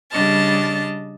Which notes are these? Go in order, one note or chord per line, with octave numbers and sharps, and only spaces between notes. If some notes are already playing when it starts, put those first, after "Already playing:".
C#3 G3 D4 D#5 A5 F6